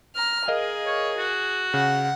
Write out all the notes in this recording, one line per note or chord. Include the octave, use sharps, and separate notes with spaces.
A#5 F6
G#4 A#4 D#5 F5
C#5
F#4
C#3 F#5